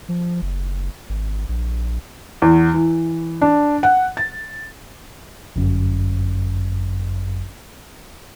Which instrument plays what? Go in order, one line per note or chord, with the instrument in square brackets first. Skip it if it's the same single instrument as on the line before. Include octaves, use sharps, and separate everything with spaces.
[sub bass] F3
F#1
G#1
A#1
[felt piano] E2
E3
D4
F#5
A6
[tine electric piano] G1 F#2